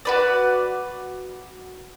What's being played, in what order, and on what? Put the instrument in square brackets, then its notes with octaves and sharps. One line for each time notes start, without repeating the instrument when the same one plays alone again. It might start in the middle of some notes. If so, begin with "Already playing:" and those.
[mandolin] F#4 B4 D5